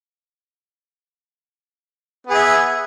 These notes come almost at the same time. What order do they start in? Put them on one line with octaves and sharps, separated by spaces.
B3 G#4 E5